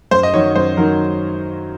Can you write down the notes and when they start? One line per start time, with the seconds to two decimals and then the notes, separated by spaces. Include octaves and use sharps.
0.11 F#2 C5
0.23 D#5
0.34 D#3 F#3 C#5
0.55 F#2 C5
0.77 D#3 F#3 A#4